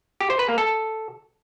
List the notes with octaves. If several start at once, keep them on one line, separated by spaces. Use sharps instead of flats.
G4
C5
B4
A#3
A4